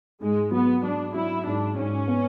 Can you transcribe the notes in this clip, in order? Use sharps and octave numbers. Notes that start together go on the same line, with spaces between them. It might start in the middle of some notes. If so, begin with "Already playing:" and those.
G#2 G#3
F#3 B3
F#3 D4
F#3 E4
G#2 D4
G#2 C#4
B3